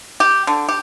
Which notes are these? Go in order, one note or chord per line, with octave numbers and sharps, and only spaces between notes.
G4
D3
G4